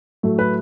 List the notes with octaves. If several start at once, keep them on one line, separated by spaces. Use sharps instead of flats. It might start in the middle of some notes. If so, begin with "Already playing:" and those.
A2 F#3 A3
B4